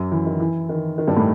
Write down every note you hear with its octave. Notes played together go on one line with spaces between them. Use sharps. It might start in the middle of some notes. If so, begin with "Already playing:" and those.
Already playing: F#2 F#3
E3
D#3
E3
D#3
D#3
G2 G3
A2 A3